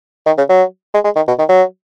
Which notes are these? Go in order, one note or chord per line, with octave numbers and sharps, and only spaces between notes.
D#3
C#3
F#3
G#3
G#3
D#3
B2
D#3
F#3